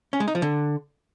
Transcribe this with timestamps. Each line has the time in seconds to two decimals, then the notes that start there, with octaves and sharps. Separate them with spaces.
0.13 C#4
0.20 G#3
0.28 D#4
0.35 F3
0.42 D3